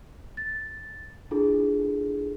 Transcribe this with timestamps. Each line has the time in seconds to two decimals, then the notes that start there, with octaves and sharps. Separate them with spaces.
0.37 A6
1.31 D4 E4 F4 G#4 A4